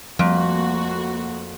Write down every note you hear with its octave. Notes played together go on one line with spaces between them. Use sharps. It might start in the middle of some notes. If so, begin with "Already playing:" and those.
F2 F3 G3 A3 A#3 F#4